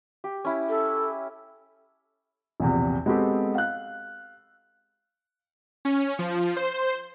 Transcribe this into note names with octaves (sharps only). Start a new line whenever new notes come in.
G4
C#4 E4
A4
A#1 E2 C3
G#3 B3 C4 F#4 G4 A4
F5 F#6
C#4
F3
C5